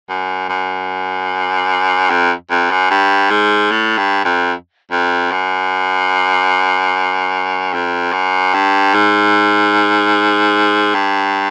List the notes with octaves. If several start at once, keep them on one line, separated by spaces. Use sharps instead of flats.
F#2
F#2
F2
F2
F#2
G2
G#2
A2
G2
F2
F2
F#2
F2
F#2
G2
G#2
G2